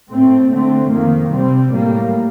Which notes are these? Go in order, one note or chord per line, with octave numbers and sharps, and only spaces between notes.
A2 A3 C4
D3 A3 C4
F2 D#3 A#3
C3 G3 C4
A2 G3 A#3